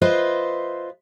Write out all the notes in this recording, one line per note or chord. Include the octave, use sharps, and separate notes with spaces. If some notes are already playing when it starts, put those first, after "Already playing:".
F4 B4 C5 D#5 E5